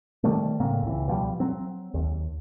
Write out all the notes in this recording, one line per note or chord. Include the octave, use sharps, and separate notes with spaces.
C3 D#3 G3 A3
A2 C#3 A#3 C4
C#2 E3
B2 F3 G3
F#3 C4
D#2